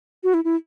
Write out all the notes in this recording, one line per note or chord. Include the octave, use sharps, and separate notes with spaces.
F#4
E4
E4